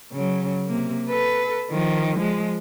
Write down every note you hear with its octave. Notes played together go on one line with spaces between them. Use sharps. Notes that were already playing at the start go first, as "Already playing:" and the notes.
C#3 F#3
C3 A#3
A4 B4
D#3 F3
F3 G#3